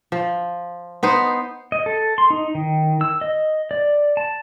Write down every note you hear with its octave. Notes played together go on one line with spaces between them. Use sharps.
F3
B3 D#4 C5
D#5
A4
C6
D#4
D#3
E6
D#5
D5
A5